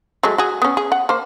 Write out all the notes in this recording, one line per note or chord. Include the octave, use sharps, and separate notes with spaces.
F#3 G#3 A3
F#4 G#4
B3 C#4
G#4
F#5
A#3 C5